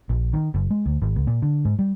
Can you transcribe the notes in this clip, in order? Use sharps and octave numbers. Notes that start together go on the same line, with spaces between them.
A#1
D#3
F#1
G#3
D2
G#1
C#2
A#2
D3
G#2
G3